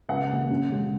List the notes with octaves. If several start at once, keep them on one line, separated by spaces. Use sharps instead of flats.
C#2 F#5
C#3 A#3
F#2
C#3 G#3